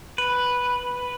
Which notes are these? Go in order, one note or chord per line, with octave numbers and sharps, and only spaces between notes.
B4